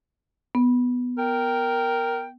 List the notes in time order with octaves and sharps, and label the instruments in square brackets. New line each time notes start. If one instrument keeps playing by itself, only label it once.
[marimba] B3
[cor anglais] A#4 [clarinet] G5